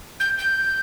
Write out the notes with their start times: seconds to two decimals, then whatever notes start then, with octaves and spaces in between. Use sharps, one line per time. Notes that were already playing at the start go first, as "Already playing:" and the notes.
0.20 G6
0.39 G6